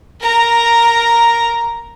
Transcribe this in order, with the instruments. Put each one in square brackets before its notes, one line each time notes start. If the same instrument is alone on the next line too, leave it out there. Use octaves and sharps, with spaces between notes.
[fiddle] A#4 A#5